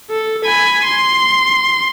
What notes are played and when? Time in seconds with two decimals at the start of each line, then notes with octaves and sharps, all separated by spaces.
0.10 A4
0.45 G#5 B5
0.85 C6